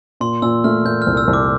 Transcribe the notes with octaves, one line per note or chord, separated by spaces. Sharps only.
A#2 C6
A#2 E6
A3 F6
A#2 G6
F6
C2
E6
C2
D6